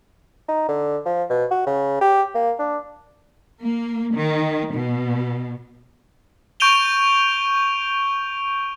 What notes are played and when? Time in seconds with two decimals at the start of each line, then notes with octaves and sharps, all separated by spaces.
0.48 D#4
0.68 D3
1.06 F3
1.30 B2
1.51 F#4
1.67 C#3
2.01 G4
2.35 A#3
2.59 D4
3.60 A#3
4.15 D#3
4.74 B2
6.60 C#6 G6 D7 D#7 F7 G7